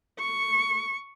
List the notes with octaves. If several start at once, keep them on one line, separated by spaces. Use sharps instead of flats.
C#6